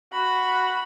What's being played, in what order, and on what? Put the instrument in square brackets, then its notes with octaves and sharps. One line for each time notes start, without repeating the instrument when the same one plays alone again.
[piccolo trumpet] F#4 [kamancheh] B5